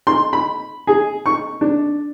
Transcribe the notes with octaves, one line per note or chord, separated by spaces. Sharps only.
C6
B5
G#4
C#6
D4